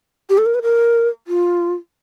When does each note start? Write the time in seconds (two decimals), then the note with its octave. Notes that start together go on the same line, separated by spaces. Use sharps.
0.30 G4
0.38 A4
0.46 A#4
0.54 B4
0.62 A#4
1.27 F4